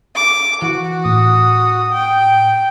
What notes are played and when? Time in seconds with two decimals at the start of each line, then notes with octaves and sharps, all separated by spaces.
0.15 D6
0.62 E3 F#4
1.05 A2 D#6
1.92 G5